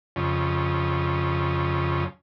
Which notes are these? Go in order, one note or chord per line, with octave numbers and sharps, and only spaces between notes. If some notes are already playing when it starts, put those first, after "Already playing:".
F2 C#3